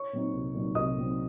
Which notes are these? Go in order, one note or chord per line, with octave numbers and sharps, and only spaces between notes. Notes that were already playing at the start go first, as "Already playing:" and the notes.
Already playing: C#5 C#6
A#2 F#3 C4 D#4
C2
A#2 F#3 C4 D#4
C2 D#5 D#6
A#2 F#3 C4 D#4